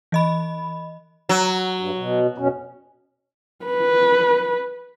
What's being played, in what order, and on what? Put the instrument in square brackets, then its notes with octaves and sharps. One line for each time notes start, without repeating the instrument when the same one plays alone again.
[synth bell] E3 D#5 B5
[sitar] F#3
[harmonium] G2
B2
F2 B2 C#4
[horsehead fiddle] B4